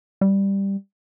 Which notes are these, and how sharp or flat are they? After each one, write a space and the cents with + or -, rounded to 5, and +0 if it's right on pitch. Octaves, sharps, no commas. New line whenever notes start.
G3 +5